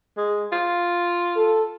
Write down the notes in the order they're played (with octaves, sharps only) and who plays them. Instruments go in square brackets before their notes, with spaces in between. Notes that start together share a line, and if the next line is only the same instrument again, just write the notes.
[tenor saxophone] G#3
F4
[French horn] A4